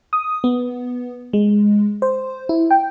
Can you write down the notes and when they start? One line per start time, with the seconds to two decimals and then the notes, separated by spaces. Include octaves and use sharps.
0.13 D#6
0.44 B3
1.33 G#3
2.02 C5
2.49 E4
2.71 G5